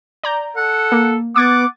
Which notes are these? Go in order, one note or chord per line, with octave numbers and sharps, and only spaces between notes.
D5 A#5 G6
A4 F#5
A#3
B3 F#5 D6 D#6 G#6 A6